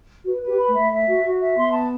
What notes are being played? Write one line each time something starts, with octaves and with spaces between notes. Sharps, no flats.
F#4 B4
B4
G4
B5
A3
E5
A3
E5
F#4
F#4
E5
B3 C6
A5